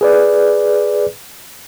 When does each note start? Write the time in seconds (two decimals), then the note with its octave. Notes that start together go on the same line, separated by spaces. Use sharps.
0.01 G#4 B4 D5